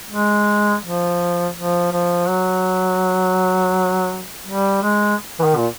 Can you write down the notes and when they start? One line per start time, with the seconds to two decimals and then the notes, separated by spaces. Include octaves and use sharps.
0.10 G#3
0.83 F3
1.56 F3
1.92 F3
2.28 F#3
4.47 G3
4.83 G#3
5.39 E3
5.43 D#3
5.57 A#2